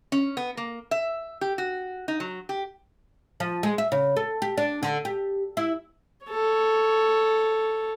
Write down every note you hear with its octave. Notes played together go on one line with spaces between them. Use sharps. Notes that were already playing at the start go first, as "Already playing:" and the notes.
C#4
B3
A#3
E5
G4
F#4
D#4
F#3
G4
F3
G#3
E5
C#3
A4
G4
D4
D3
G4
E4
A4 C#5